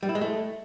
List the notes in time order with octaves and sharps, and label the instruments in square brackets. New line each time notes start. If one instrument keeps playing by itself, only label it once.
[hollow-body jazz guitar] G3
E4
G#3
A3